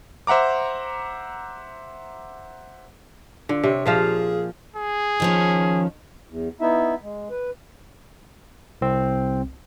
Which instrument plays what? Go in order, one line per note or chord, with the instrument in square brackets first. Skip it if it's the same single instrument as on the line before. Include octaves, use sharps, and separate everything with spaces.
[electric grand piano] C5 E5 F#5 A#5 D6
[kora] D3 [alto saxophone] F4
[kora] C3 [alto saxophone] C#5
[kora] A#2 F3 F5 [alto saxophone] G#4
[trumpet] G#4
[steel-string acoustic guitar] D#3 F3 C#4
[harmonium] E2
B3 D#4 E4 E5
G#3
B4
[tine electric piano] C2 C4